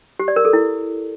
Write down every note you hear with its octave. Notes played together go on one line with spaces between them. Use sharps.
G4
D5
A#4
A4
E4